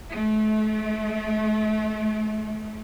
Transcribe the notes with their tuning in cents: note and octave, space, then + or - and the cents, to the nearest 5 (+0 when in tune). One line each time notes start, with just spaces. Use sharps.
A3 -35